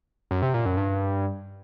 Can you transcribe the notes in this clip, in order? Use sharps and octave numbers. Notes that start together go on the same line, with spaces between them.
F#2
C3
A#2
F#2
G2